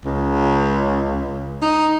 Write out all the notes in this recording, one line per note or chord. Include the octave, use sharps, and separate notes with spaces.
C#2
D#4